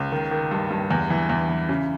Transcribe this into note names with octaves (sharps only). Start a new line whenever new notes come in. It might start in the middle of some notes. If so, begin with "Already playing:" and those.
Already playing: C#2
D#3
D#3
G2
G2
E2
E3
E2
E3
C#3